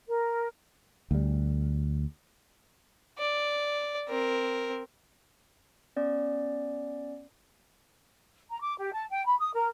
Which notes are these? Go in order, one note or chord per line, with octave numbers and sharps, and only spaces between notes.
A#4
D2 G3
D5
C4 A#4
B3 C#4 D5
A#5
D6
G4
A5
G5
B5
D#6
A#4